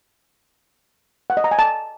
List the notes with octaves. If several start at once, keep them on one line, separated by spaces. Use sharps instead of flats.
F#5
D#5
A#5
G#5
A5